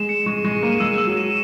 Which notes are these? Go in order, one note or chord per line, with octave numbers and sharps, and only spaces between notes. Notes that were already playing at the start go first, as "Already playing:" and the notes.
Already playing: G#3 E7
C#7
G#3 C#6
G#3 C#6
A#3 D#7
G#3 E6
E6
F#3
E7